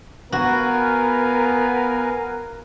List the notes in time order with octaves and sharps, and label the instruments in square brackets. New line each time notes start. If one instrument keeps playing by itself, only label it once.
[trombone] B3 [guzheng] F#4 [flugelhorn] A#4 [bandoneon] B4 F5 G#5